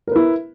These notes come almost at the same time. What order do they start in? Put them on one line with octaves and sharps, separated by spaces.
A#4 B4 E4